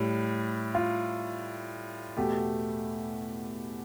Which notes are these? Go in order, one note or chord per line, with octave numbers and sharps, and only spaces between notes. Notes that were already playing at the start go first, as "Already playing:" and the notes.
Already playing: A2 G3
F4
E2 B2 A3 G4